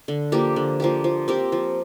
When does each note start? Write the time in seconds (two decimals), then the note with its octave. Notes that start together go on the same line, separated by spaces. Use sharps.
0.08 D3
0.32 F3 A#3 G4
0.56 D3
0.80 F3 A#3 G4
1.04 F3
1.28 C4 G4 A#4
1.52 F3